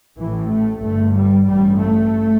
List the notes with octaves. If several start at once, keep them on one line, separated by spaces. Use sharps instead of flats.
A1 A2 E3
A3
G1 G2 A3
G3
A1 G2 G3
A3